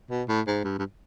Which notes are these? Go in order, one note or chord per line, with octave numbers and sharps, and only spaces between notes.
B2
A2
G#2
G2
G2